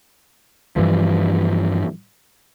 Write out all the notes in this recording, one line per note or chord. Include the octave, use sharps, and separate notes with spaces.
G2 E3 F3